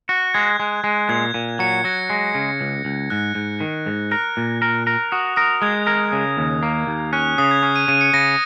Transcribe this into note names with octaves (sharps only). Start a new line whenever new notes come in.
F#4 F#6
G#3 G#6
G#3
G#3
A#2 G#6
A#2
F#3 C#7
F#3 A#6
G#3
C#3
C#2
C#2
G#2 F#6
G#2
D#3
G#2
A#4 F#6
A#2
A#4
A#4
F#4 D#6
A#4 D#6
G#3 G#6
A#4
C#3
D#2
A#3
D#2
C#4 F#6
C#3 D#6
G#6
C#4
D#7
C#3 D#7
C#7
C#3 A#6